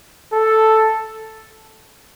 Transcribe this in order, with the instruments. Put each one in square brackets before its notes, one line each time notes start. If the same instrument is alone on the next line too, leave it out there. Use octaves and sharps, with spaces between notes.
[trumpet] A4